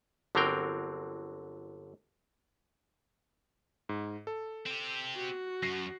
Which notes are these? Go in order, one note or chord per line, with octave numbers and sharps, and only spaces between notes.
G1 D3 F#3 C4 A#4 G5
G#2
A4
C4 G4
F#4
F#2 A#6 C7